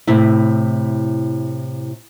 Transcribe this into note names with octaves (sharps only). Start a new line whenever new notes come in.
A2 C3 E4